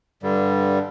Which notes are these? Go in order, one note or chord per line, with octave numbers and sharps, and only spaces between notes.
G2 D3 G3